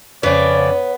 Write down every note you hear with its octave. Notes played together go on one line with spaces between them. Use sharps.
F2 C#3 B3 C#5 D5